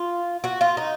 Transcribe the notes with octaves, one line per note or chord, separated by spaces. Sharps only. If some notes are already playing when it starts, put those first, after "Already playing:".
Already playing: F4
F#4
F4
D#4